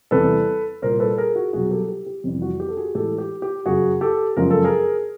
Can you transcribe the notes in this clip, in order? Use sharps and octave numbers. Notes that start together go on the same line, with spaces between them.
E2 C3 E3 G3 A4 B4
C2 A#2 G3 A#4 C5
A4 B4
G#4 A#4
F#4 G#4
C2 B2 F#3 F#4 G#4
G4 A4
G4
G4
F2 C3 E3 G3
F#4
G4
A4
F#4 G#4
A2 E3 G#3 G4 A4
G4
G4
F#2 C#3 F#3 F#4 G#4
G4 A4
F#2 C#3 F3 G#3 A#4
A4
G#4 A#4